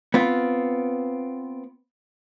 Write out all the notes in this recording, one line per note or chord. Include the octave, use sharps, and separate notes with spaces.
B3 C4 F4